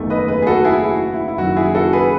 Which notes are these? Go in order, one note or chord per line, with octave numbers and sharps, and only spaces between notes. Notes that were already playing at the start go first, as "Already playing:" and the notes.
Already playing: F#1 E2 D#3 A3
B4 D#5
G#4 B4
G#4
F#4 A4
E4 G#4
F#4
E4
E4
F#1 F#2 D#3 F#3 F#4
E4 G#4
F#4 A4
G#4 B4